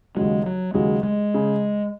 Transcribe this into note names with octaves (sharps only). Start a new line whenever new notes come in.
D#2 C#3 F#3 G#3
F#3
D#2 C#3 F#3 G#3
G#3
C#3